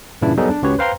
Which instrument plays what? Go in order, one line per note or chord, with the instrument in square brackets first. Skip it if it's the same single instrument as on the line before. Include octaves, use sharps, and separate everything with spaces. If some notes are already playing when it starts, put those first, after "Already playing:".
[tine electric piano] G2 A#2 C#3 E3 D4 E4
F#3 G3 B3 D#4 G#4 A4
D4
C#2 C#4 F#4 G4 B4 C#5
B4 C5 F5 G5 A#5 C6